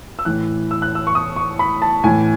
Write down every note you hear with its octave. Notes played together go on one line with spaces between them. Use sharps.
E6
A2 E3 F#6
E6
F#6
E6
C#6
D#6
C#6
B5
A5
A2 E3 G#5